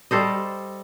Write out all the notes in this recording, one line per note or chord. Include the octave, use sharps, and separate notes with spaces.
G3 A4 C5 D#5